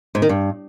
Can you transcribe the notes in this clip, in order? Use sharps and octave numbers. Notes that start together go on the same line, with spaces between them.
G#2
D#3
G2